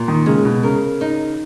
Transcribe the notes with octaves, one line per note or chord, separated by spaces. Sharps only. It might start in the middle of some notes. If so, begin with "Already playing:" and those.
Already playing: A#2
D#3
C#3 G#3
B2
C#3 A#4
D#4